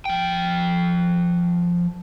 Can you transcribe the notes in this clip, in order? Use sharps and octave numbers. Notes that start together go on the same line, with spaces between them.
F3 G5